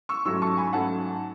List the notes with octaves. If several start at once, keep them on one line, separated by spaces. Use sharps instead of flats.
C#6 E6
G#2 F#3 A3 C#4 C#6 E6
A5 C#6
G#5 B5
G#2 F#3 A3 C#4 F#5 A5